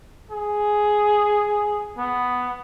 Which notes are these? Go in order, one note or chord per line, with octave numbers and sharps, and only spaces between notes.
G#4
B3